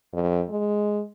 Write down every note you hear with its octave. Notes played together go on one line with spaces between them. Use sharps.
F2
G#3